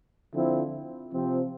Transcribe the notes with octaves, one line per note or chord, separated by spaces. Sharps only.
D3 F3 C4 E4
C3 F3 C4